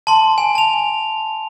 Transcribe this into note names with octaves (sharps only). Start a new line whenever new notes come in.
A5 C6
G#5
A5 F7